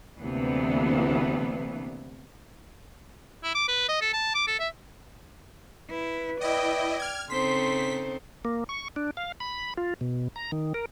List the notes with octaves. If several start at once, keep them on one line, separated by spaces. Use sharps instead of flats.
D2 C3 E3 A#3 B3 D4
E4
D6
B4
D#5
A4
A5
D6
A4
E5
E4 B4
E4 D5 D#5 G5
F6 G#6
C#3 C4 D#4 A4 C5 C6 B6
A#3
C#6
D4
F5
B5
F4
B2
A#5
D#3
A#4